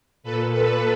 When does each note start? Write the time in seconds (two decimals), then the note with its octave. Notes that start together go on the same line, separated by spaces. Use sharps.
0.23 A#2 A4 B4
0.53 A4 B4